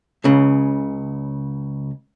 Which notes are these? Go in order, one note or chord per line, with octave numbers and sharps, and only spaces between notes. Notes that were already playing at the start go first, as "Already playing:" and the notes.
C#2 C#3